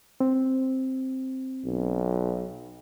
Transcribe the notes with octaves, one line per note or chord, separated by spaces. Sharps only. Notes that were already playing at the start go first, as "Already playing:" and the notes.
C4
B1